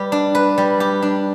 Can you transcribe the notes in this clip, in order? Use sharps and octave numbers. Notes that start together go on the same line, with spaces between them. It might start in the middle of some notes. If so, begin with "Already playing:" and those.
Already playing: G3 G4 B4
D4
B4
G3
G4
D4